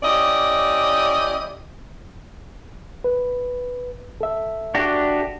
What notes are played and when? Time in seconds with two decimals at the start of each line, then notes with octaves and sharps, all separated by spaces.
0.03 C#4 E4 G4 D5 D#5
3.04 B4
4.21 A4 E5
4.75 D4 F#4 G4